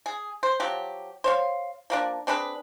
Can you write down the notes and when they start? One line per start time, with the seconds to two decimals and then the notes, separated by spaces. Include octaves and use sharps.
0.06 G#4
0.43 C5
0.60 F3 F#3 G4
1.24 C5 C#5 F5
1.90 F3 A#3 D4
2.27 C4 D4 G#4 B4